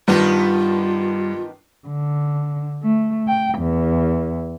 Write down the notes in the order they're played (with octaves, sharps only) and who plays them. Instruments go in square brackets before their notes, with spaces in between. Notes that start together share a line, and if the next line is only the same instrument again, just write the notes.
[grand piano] G2 [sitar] D#3 B3 D4 [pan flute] F4
[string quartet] D3
A3
G5
E2